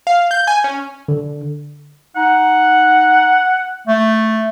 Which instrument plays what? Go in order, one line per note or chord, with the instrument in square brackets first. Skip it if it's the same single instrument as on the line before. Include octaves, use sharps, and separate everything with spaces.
[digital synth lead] F5
G6
G#5
C#4
[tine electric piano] D3
[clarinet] D#4 [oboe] F#5
[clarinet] A3